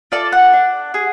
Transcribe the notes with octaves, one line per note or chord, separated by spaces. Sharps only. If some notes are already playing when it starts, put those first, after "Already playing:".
F4 A4 D5
F#5
D4
G#4